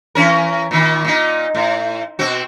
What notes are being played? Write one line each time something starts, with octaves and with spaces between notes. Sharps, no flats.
E3 C#4 A#4
A#2 D#3
A#2 D#4
A2
B2 C4 F#4